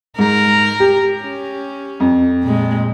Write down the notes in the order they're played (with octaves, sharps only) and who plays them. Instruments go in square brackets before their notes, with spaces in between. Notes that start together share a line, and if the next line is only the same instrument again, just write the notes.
[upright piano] G#2 [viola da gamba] A#4
[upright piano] G4
[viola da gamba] C#4
[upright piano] F2
[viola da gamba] A#2 G#3